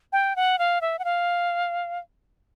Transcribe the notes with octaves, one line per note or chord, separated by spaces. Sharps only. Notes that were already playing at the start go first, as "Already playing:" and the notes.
G5
F#5
F5
E5
F#5
F5